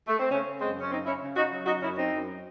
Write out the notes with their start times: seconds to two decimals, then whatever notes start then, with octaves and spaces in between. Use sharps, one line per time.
0.08 A3
0.19 C4
0.30 C#3 A3 C#4
0.60 F#2 G#3 C4
0.80 C#4
0.91 C#3 C4 D#4
1.06 C#4 E4
1.22 C#3
1.36 D#4 F#4
1.52 F#3
1.66 D#4 F#4
1.82 F#2 C#4 E4
1.97 C4 D#4
2.12 F#2